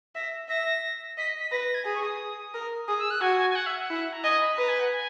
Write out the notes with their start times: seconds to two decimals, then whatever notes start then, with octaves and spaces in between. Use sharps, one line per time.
0.15 E5 A#6
0.49 E5 A#6
1.17 D#5 B6
1.40 B6
1.51 B4 A#6
1.63 A#6
1.74 G#6
1.85 G#4
1.95 C#6
2.03 D#6
2.54 A#4
2.87 G#4 D#6
2.99 E6
3.11 F#6
3.21 F#4 G#5
3.38 G#5
3.50 G#5
3.55 F#5
3.66 E5
3.79 F#5
3.90 E4
4.13 A#5
4.24 D#5 G#5
4.40 B5
4.57 B4 A#5
4.68 G#5
4.80 F#5
4.92 G#5